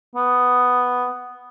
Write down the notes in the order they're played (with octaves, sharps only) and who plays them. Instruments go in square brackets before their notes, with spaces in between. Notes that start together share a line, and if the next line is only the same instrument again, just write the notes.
[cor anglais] B3